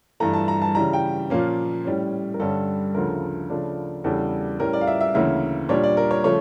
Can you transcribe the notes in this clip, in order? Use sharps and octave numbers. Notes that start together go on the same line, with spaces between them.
G2 E3 A3 A#5
A5
A#5
A5
C#3 E3 G3 A#5
G5
A#2 F3 A#3 C#4
A2 G3 C#4
A#4
G2 D3 G3 C#4 A4
D2 C#3 F3 A3 A#4
C#3 F3 A3 D4
E2 C#3 G3 D4 A4
A2 G3 C#4 A#4
D5
F5
E5
E5
D2 C#3 E3 A#3 C#4 E5
A#2 G3 D4 C#5
D5
A#4
C#5
C#3 F3 A3 C#5